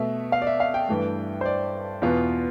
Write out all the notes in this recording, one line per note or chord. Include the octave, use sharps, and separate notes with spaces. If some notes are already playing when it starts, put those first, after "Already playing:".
Already playing: B2 A3 E5
F5
D5
E5
F5
G5
G2 E3 A3
C5
D5
E2 B2 B3 F4